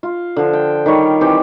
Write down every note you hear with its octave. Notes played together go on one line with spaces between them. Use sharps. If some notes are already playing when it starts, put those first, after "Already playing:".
F4
D3 F3
G5
D#3 G3 C#5
E3 C4 G4 C5